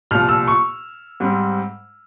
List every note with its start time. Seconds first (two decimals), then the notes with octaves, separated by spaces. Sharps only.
0.11 C2 A#2 F3 F6
0.29 E6
0.48 C#6
1.20 G#2 G3 C4